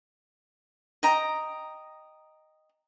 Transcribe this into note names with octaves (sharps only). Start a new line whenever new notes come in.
D#5 G5 A#5